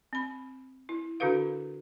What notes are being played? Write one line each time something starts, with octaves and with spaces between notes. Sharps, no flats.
C4 B5
E4
D3 D4 F#4 A4 B4 F5